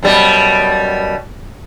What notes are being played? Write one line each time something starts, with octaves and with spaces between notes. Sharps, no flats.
F#2 B2 G3